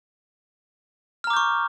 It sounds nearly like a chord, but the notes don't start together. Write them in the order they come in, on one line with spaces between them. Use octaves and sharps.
F6 A#5 D6 G6 C#6